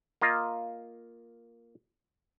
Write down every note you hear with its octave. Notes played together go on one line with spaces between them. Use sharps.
A#3 F4 D#5